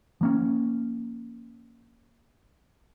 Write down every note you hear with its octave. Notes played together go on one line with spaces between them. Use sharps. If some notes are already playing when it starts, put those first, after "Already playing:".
F3 A#3 C#4